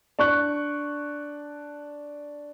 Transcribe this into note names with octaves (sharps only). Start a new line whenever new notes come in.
D4 C#6 F#6